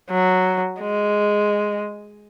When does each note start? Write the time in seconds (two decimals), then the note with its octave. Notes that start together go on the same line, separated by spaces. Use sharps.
0.10 F#3
0.81 G#3